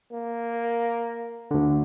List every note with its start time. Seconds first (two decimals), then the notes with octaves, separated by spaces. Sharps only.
0.12 A#3
1.51 D2 D3